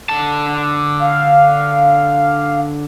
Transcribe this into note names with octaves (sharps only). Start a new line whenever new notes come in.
D3 A5
F5